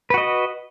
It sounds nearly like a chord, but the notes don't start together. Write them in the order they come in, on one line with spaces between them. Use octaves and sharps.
B4 F#4 D#5